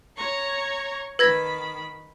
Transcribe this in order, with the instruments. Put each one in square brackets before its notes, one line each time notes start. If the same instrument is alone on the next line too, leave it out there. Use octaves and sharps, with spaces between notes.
[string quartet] C#5 A#5 C#6
[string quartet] D#3 B5 [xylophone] B4 G#6 A#6